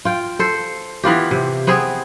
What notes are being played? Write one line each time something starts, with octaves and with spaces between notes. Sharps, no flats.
F4 G5
A4 C5
E3 B3 F4 G4
C3
B3 C4 G#4